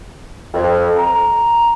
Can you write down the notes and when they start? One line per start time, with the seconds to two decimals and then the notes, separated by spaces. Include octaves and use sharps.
0.54 F2
0.97 A#5